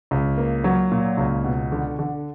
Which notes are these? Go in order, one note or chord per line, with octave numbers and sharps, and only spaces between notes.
C#2
A#3
F#3
A#2
C#2
B2
D3
D3